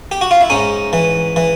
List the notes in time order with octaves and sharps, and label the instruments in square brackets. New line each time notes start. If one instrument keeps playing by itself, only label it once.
[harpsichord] G4
F#4
F4
E4
G#2 C#4 D#4
E3
E3